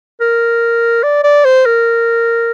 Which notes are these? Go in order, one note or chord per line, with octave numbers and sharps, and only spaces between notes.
A#4
D5
D5
C5
A#4